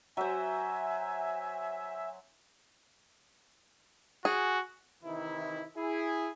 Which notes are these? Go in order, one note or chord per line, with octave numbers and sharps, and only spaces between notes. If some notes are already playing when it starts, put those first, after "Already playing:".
F#3 C5 E5 G#5
F#4 G#4
C3 D#3 E3 D#4 E4
E4 G#4